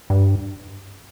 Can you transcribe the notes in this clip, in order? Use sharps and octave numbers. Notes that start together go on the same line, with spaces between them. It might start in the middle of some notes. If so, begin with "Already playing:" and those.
G2